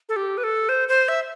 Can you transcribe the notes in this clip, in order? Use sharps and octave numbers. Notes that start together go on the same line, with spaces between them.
A4
G4
B4
A4
C5
C5
E5